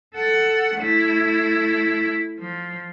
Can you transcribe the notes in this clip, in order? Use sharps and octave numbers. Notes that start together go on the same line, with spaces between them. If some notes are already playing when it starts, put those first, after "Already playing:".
A4 F#5
A3 E4
F3